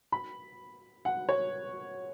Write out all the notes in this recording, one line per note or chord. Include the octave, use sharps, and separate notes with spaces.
B5
F#5
C#5